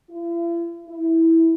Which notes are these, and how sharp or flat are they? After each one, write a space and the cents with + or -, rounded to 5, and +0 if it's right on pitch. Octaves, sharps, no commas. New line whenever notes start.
E4 +45
E4 -10